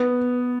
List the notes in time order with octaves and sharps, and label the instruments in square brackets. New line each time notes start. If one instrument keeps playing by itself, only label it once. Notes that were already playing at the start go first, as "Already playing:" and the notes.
Already playing: [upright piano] B3